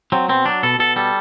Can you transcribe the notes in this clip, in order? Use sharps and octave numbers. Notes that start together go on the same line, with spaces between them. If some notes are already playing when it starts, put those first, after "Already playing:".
F#3 C4
B2 C4
F#3 D4
B2 A4
B2 A4
G3 A4